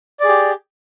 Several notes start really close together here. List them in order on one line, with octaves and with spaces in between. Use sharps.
D5 G#4 G4